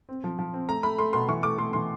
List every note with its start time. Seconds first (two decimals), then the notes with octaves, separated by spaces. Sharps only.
0.09 C4
0.24 F3
0.39 F3
0.54 C4
0.69 A3 A#5
0.83 A3 B5
0.99 A3 C6
1.13 B2 C6
1.28 E3 C#6
1.43 A3 D6
1.58 A3 C6
1.73 E3 C6